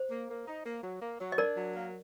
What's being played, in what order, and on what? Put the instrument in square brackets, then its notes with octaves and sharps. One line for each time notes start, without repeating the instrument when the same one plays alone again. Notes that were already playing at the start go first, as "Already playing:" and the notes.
Already playing: [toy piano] C5
[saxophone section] A#3
A#3
D#4
A#3
F#3
A#3
F#3
[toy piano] D#5
[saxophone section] D4 [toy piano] A#4 D5
[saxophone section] F#3
A#3